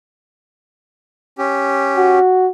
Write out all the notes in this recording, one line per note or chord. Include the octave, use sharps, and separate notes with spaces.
C#4 G4
F#4